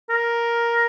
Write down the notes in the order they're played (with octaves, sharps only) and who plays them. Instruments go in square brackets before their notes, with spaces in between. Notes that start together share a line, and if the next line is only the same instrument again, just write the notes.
[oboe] A#4